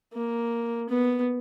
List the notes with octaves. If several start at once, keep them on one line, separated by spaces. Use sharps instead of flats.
A#3
B3